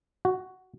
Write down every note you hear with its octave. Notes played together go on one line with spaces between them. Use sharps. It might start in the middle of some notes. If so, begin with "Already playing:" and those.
F#4